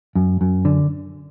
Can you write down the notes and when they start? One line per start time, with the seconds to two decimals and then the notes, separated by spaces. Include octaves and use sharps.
0.15 F#2
0.41 F#2
0.65 D3